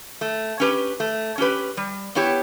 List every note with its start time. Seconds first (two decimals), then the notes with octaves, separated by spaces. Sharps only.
0.21 A3
0.60 C#4 G4 B4
1.00 A3
1.38 C#4 G4 B4
1.77 G3
2.15 B3 E4 G4 C#5